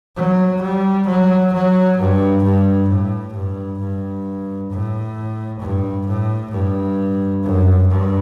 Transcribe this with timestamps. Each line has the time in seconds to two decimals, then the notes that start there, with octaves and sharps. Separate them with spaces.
0.17 F#3
0.62 G3
1.08 F#3
1.53 F#3
1.98 G2
2.44 G2
2.89 A2
3.34 G2
3.79 G2
4.70 A2
5.61 G2
6.07 A2
6.52 G2
7.43 F#2
7.88 G2